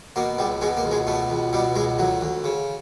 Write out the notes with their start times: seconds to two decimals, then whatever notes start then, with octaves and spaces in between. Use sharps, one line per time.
0.16 B2 A#3
0.38 C#2 G3
0.61 B2 G#3
0.77 A#3
0.84 C#2
0.91 G#3
1.07 B2 A3
1.30 C#2
1.53 B2 G3
1.76 C#2 G#3
1.99 D2 F#3
2.21 D2
2.44 C#3